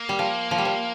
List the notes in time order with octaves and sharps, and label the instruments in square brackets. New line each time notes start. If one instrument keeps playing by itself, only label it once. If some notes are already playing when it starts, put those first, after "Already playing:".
Already playing: [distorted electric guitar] A#3
[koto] G3
F3
F3
G3
F3